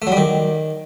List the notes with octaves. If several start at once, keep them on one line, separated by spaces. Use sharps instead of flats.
A3
F#3
G3
D#3